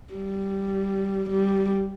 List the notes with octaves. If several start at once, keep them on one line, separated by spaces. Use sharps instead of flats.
G3
G3